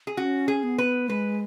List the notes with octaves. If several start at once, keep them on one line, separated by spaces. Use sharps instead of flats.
G#4
C#4 F#4
G#4
B3
B4
G#3 B4